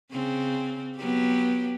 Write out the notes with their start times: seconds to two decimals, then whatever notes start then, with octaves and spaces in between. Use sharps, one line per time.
0.12 C#3 C4
0.97 F#3 B3 G4